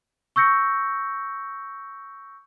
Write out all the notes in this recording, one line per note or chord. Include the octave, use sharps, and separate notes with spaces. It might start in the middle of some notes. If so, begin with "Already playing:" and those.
C#6 E6 G6 A#6 C#7